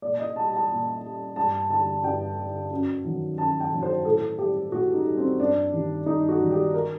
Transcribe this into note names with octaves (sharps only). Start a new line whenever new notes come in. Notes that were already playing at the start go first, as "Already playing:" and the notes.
A#2 D5
D#5
G3 A5
A5
A#2
G3
G2 A5
D3 G3 A5
G2 G5
D3 G3
F#2
D#3 F#3
F#2 A5
G5
D#3 F#3
C5
A2 A4
G3 G4
A2 F#4
D#4
G3
C4
G2 D4
D#3 G3
G2 D#4
F#4
D#3 G3
G4
A#4